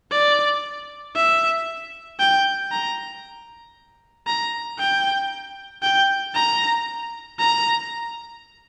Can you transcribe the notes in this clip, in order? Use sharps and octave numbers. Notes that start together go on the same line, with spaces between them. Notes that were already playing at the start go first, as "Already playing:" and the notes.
D5
E5
G5
A#5
A#5
G5
G5
A#5
A#5